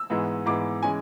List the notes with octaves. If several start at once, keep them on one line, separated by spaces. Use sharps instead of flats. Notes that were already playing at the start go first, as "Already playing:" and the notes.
Already playing: E6
G#2 E3 G#3 B3
G#2 E3 G#3 B3 D6
E3 G#3 C#4 G#5